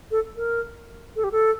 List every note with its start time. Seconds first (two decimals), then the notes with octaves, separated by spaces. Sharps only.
0.11 A4
0.37 A#4
1.16 A4
1.24 G4
1.32 A4